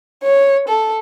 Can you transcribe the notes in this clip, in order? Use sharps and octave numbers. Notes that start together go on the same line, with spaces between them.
C#5
A4